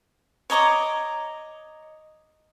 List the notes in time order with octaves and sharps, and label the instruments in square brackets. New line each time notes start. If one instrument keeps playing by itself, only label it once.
[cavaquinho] C#5 D#5 A#5 D6